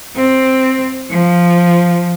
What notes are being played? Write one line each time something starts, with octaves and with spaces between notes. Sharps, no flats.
C4
F3